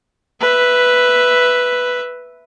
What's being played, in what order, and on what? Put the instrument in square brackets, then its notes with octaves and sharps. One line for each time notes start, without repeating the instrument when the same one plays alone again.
[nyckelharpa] B4 E5